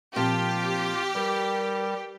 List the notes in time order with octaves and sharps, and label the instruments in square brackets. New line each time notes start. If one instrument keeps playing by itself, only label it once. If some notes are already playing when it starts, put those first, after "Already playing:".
[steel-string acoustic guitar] A#2 C4 A5 [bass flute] F3 [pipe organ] F4 [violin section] G4
[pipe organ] G3 [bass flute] A#4 [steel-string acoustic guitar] B4